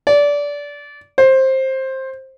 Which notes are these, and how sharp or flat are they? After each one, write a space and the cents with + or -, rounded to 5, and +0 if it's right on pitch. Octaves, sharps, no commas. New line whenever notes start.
D5 -20
C5 +15